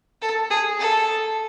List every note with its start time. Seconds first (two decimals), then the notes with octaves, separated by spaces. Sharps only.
0.22 A4
0.50 G#4
0.79 A4